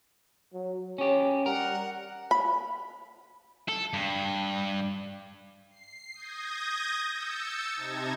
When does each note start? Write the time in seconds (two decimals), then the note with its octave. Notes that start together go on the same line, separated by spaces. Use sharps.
0.54 F#3
0.98 C#4 G4 C#5
1.46 G3 A#4 F#5
2.31 B5
3.68 A4
3.93 G2
5.70 C7
6.14 D#6 G6 G#6 A#6
7.12 E6 G6 A6 C#7
7.76 C3 D#4 A5 G#6 A#6